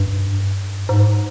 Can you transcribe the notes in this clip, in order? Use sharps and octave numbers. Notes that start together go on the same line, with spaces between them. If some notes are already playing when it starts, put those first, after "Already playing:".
Already playing: G2
G#2